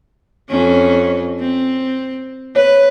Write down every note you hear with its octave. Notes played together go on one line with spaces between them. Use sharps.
F2 C#4
C4
B4 C#5